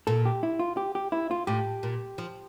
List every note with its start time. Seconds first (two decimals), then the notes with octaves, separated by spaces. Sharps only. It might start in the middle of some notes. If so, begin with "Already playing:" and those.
0.07 A#2 A4
0.25 G4
0.43 E4
0.59 F4
0.77 G4
0.95 G4
1.12 E4
1.31 F4
1.47 A2 G4
1.83 A#2
2.18 F3